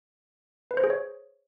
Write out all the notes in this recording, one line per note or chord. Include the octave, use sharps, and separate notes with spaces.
B4
C5
G#4
C#5